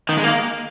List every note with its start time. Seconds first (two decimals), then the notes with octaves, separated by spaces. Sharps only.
0.09 D#3
0.18 G#3
0.24 A#3